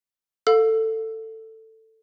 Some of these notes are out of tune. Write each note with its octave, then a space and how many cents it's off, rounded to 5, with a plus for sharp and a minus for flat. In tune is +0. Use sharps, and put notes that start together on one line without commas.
A4 +15 F5 +30